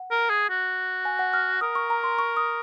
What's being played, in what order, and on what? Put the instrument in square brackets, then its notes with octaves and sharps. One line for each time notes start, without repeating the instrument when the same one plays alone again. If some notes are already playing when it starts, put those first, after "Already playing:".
Already playing: [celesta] F#5
[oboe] A#4
G#4
F#4
[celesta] G#5
F#5
F6
[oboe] A#4 [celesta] D#6
[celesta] C#6
A#5
C6
C#6
D#6